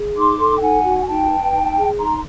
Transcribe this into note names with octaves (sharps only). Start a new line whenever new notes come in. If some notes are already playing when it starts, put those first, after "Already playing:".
Already playing: G#4
D#4 C6 D6
A4
G5
D#4 F#5 G#5
F#4
G#5
D#4 G5 A5
B4
D#4
G#4
D#4 A#5 C6